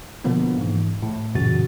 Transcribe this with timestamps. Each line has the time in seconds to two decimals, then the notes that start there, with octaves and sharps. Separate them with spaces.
0.24 B2 D3 F3 A#3 B3
0.58 G#2 E3
1.02 A2
1.35 F#2 A#2 C#3 E3 F#4 A6